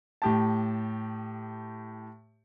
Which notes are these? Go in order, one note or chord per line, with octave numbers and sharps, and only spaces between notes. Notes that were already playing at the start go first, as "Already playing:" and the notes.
A2 G4 A5